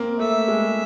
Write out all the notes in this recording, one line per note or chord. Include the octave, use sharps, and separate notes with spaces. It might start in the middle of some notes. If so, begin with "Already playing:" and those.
Already playing: A#3 C4
A3 E5
G#3